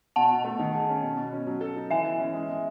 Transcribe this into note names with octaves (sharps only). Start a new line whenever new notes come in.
B2 F#5 A5
B2
A3
D#3
G#4
C#4
B2
B2
C#4
F#3
A4
D#4
E3 E5 G#5
E3
C#4
G#3
G#3